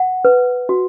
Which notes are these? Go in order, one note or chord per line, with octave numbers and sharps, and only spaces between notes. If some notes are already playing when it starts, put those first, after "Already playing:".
Already playing: F#5
B4
F#4